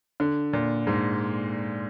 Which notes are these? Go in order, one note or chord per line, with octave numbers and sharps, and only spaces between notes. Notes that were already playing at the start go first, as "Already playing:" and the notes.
D3
A#2
G#2